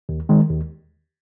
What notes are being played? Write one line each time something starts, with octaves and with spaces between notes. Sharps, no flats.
D#2
D#3 G#3
D#2